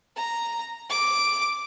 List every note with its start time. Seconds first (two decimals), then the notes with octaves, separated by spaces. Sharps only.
0.17 A#5
0.90 D6